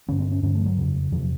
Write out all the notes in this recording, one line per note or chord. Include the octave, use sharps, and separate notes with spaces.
G2 D3 C#4
C4
C#4
G2 D3 C#4
A3
F3
F#3
F2 C#3
E2 C3 F3